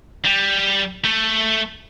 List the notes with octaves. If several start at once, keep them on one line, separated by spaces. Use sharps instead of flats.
G3
A3